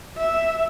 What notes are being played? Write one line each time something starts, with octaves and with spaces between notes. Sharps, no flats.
E5